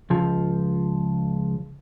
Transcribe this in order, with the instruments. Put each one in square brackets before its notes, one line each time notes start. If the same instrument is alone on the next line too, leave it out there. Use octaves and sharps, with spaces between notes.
[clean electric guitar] C#2 F3